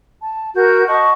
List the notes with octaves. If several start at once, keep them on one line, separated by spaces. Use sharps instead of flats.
A5
F#4 A#4 G6
D#5 F#5 A5 C#6